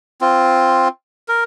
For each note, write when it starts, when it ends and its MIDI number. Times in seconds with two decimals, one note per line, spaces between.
0.21 0.88 60
0.21 0.88 65
1.28 1.44 70